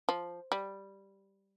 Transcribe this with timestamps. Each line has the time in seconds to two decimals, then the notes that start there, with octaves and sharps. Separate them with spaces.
0.09 F3
0.52 G3